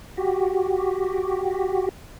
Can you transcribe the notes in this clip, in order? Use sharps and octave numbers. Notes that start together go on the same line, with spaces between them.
F#4 G4